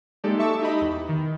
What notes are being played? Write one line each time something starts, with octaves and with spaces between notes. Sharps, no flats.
G#3 A#3 D#4 G4 A4 D5
E5 A5 C#6 D6 E6
D#4 G4 D#5 B5
E2
D#3